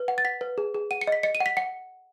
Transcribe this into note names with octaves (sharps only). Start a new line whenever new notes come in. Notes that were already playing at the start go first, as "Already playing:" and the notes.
Already playing: B4
F#5
A6
F#5 B6
B4
G#4
G#4
F#5 D#7
C#7
D#5 B6
D#5 C#7
D#7
F#5
B6
F#5 C#7